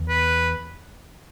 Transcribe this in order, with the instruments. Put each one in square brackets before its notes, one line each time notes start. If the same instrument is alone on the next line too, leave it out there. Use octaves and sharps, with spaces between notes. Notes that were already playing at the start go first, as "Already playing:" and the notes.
Already playing: [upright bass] E2
[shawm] B4